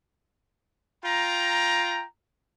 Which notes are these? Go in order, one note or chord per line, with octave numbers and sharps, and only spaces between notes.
F4 G5 A#5